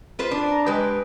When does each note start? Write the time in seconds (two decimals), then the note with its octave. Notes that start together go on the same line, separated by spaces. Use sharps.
0.19 F4 B4 C5
0.31 D4
0.51 A#5
0.66 G#3 G4 B4